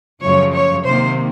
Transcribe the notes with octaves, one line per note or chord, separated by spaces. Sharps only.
F#2 C#3 F3 A3 C#5
C#5
C3 D#3 A#3 C5